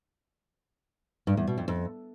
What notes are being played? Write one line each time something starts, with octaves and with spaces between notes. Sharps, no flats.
G2
E2
B2
F2
F2